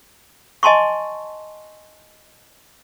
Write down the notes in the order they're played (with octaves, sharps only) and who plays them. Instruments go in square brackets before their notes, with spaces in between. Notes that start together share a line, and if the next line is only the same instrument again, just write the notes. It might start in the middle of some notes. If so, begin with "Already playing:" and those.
[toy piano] D#5 G#5 A5 C6 C#6